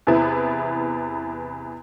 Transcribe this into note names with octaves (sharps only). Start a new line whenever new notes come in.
E2 C3 B3 E4